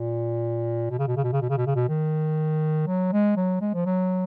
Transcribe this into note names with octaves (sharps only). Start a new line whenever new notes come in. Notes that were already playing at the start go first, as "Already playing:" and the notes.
Already playing: A#2
B2
C#3
B2
C#3
B2
C#3
B2
C#3
B2
C#3
B2
D#3
F#3
G#3
F#3
G#3
F3
F#3